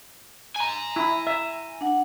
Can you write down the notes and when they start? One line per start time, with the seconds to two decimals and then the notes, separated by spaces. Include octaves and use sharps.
0.56 G#5 A#5
0.96 E4
1.27 E5
1.81 D4 F#5